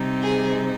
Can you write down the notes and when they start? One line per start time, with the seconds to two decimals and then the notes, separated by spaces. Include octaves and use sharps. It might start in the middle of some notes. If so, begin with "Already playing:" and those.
Already playing: C3 G3 C4 D#4
0.21 G#4